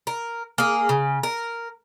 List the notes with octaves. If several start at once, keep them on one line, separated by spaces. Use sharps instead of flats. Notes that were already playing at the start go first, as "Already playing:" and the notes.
A#4
A#3 G#4
C#3
A#4